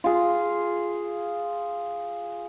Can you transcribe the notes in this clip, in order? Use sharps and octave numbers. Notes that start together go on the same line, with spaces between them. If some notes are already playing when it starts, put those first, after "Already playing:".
F4 G#4